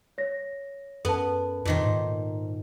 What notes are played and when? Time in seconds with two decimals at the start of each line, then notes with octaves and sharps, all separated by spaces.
0.18 C#5 A#6
1.05 F#2 B3 A4 A5
1.65 F2 A#2 D#3 C5
1.83 G#2